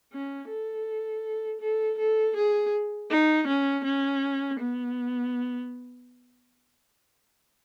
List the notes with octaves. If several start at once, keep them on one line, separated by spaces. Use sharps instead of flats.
C#4
A4
A4
A4
G#4
D#4
C#4
C#4
B3